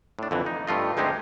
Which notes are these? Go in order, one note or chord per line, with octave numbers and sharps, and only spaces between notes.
A2 D4
F2 D3 E3
D#4
G2 A3 F4 D#5
D2 G#3 C4 D#4 G4